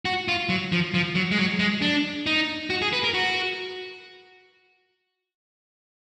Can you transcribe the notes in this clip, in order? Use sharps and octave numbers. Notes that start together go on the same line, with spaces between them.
F#4
F4
F#3
F3
F3
F#3
G#3
F#3
G#3
D4
D#4
F#4
G#4
B4
A#4
F#4